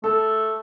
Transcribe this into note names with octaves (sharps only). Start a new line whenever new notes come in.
A3 A4